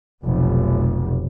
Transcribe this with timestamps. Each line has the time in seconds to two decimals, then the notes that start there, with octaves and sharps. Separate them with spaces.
0.23 F1 B1